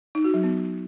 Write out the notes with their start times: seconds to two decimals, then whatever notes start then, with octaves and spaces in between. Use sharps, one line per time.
0.15 D#4
0.24 F#4
0.34 F#3
0.43 B3